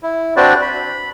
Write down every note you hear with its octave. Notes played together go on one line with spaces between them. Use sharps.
E4
C4 D4 F#4 B4 C5 D5
B5